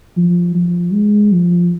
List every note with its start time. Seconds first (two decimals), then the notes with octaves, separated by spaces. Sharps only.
0.17 F3
0.55 F3
0.93 G#3
1.32 F3